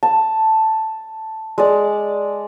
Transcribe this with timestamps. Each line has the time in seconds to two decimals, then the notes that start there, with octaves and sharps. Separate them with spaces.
0.03 A5
1.58 G#3 D5